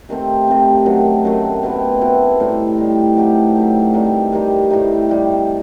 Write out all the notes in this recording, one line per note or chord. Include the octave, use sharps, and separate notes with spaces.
C3 D#3 A3 C4
C3 D#3 A3 C4
F#2 D#3 F#3 A3
F#2 D#3 F#3 A3
B2 A3 C4 E4
B2 A3 C4 E4
A2 G3 D#4
A2 G3 D#4
F#3 A3 D#4 G4
F#3 A3 D#4 G4
C3 D#3 G3 D#4
C3 D#3 G3 D#4
A2 G3 D#4
A2 G3 D#4